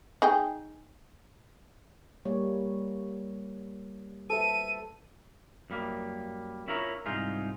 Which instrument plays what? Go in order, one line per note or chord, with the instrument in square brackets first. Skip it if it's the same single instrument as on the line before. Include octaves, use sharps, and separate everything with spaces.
[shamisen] D#4 G#4 G5
[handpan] G3 A#3 C#5
[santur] A4 [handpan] B4 C5 E5 [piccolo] D#7
[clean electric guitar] F#2 G3 A#3
C#4 E4 F4 A#4 C#5
C2 G#2 D#4 F4 G#4